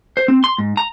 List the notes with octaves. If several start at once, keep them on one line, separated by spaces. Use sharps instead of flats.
C5
C4
C6
G#2
A#5